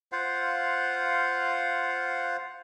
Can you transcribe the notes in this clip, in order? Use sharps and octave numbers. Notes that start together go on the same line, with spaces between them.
F4 C5 F5 F#5